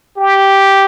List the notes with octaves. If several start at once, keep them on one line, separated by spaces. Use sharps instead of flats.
G4